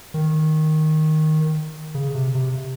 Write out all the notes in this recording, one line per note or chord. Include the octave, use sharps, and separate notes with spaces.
D#3
C#3
C3
C3